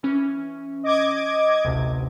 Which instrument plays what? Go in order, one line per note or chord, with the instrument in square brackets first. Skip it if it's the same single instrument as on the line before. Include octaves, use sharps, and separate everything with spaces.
[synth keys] E3 C#4
[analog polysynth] D#5 D6 G#6
[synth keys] A1 D2 C3